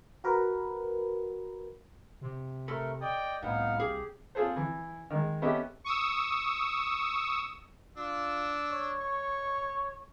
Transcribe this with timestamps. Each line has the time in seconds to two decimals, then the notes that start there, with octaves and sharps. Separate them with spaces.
0.24 F#4 A#4 B4
2.21 C3
2.68 A3 A4 A#4 B5
3.01 D5 D#5 G5 D#6
3.43 C2 A2 B3 D#4 F5 F#5
3.80 G4 G#4
4.35 C4 F4 G#4 A4 C5
4.56 E3
5.10 D#3 G#3
5.42 B3 C#4 G4 A4 D#5 E5
5.84 C#6 D#6 E6
7.97 D4 F4 E6
8.71 C#5
9.01 C#6